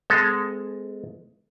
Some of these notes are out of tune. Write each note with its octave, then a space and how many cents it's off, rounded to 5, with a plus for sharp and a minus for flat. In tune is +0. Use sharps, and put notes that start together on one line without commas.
G#3 +0 C4 -45 A4 +0